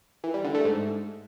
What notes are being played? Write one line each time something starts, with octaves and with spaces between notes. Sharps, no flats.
E3
G3
D3
A3
G#2